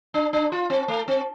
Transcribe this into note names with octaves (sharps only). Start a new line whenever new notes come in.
D4
D4
F4
C4
A3
C4